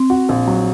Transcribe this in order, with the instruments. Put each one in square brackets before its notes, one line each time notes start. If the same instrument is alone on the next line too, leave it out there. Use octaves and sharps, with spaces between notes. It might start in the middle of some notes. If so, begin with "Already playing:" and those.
Already playing: [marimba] C4
[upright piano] F#4
A#1
F#3